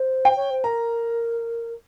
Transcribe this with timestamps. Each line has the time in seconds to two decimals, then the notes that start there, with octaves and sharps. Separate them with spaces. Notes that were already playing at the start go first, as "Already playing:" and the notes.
Already playing: C5
0.25 G5
0.36 C#5
0.50 C5
0.64 A#4 A#5